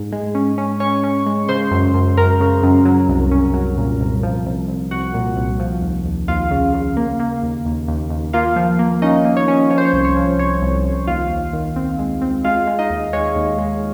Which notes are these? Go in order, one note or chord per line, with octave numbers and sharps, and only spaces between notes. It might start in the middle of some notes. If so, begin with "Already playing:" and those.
Already playing: G#2
G#3
C#4
C#4
C#4 C#5 C#6
C#4
G#3
C#3 C5 C6
F#2
F#2
F#2 A#4 A#5
C#3
F#2
F#3
C2
C#4
F#3
A#2
C2
F3
C2
C2
C2 F#4 F#5
A#2
C2
F3
D#2
D#2
D#2 F4 F5
C#3
C#3
A#3
A#3
D#2
D#2
D#2
D#2
A#3 F4 F5
F3
A#3
C#4 D#4 D#5
A#3
C#5
C#4
F3 C#5
C5
C#5
C2
C#5
F3
C2 C#5
C2
C2
D#2 F4 F5
D#2
D#3
C4
G#3
C4
G#3 F4 F5
G#3
D#4 D#5
D#2
G#3 C#5
D#2
G#3